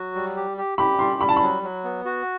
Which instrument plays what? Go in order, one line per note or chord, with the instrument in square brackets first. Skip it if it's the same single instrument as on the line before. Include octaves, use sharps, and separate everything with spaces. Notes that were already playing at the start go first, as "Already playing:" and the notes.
Already playing: [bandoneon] F#3 F#4
G3
G4
G4
[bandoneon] G4 [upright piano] B5
[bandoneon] G3 [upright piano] C6
[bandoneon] G3 [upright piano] B5
[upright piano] A5
B5
[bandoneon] F#3
F#3
B3
F#4